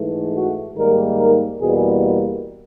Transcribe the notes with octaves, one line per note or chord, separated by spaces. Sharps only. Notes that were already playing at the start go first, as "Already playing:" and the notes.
Already playing: G#2 E3 A3
F#4
G#2 D#3 G3 A#3 A#4
A#4
E2 B2 G3 A#3 G#4